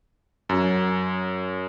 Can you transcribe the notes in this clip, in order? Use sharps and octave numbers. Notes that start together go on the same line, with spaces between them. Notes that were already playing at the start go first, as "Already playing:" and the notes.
F#2